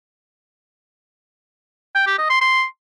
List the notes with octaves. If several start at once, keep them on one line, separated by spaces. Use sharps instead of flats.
G5
G4
D#5
C6
C6